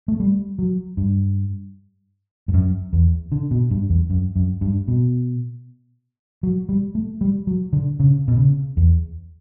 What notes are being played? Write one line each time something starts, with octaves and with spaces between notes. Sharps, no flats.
A3
G3
F#3
G2
G2
F#2
E2
D3
B2
G2
E2
F#2
F#2
G2
B2
F#3
G3
A3
G3
F#3
D3
C#3
B2
C#3
E2